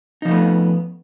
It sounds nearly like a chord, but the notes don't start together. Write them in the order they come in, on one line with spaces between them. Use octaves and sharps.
D#4 F3 A3 B3